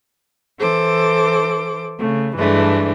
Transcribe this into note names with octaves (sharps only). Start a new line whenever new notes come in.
E3 A4 C5 D6
C#3 A3
G2 E3 G#3 A3 D4